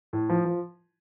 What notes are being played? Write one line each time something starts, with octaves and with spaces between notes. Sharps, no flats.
A2
F3
F3